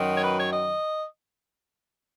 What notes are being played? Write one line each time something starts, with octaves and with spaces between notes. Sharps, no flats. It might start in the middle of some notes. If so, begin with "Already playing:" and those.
Already playing: F#2 D#3 F#3
C#5
B4
C#5
D#5